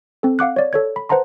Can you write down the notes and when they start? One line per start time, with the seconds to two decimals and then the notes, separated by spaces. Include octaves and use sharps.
0.23 C4 A4
0.39 F5 F#5 D6 F#6
0.56 C#5 D5
0.73 A4 C#5 G#6
0.96 B5
1.09 B4 C5 F#5 A5 A#5 C6